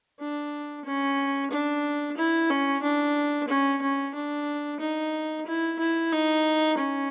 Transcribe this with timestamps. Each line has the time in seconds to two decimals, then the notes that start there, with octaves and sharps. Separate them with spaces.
0.20 D4
0.85 C#4
1.51 D4
2.17 E4
2.50 C#4
2.83 D4
3.48 C#4
3.82 C#4
4.14 D4
4.80 D#4
5.46 E4
5.79 E4
6.12 D#4
6.78 C#4